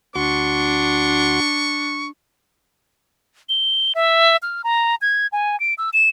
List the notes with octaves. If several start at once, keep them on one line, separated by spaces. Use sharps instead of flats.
D2 D4 F#4 C6 C#6
G7
E5
F6
A#5
G#6
G#5
D7
E6
E7